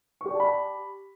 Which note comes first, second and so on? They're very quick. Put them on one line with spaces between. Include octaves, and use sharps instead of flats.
C#6 G4 D5 A5 B5